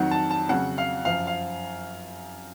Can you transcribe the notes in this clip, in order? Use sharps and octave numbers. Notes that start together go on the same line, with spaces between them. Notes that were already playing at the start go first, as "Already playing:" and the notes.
Already playing: F2 D#3 F#3 F#5
A5
A5
F2 C#3 F#3 F#5
F5
F#2 F3 F5
F5